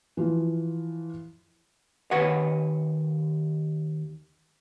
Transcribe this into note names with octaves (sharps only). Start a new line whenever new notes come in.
E3 F3
D#2 D#3 B4 C#5 F#5